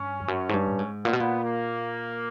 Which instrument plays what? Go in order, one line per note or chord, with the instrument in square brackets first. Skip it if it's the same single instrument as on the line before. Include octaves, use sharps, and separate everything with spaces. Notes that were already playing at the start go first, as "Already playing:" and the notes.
Already playing: [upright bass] G2 [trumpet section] C#4
[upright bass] F2
F#2
G#2
G2
A2
G#2
[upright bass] A#2 [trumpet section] B3
[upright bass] B2
A#2
[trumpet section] A#3